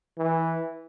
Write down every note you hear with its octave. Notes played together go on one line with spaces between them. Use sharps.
E3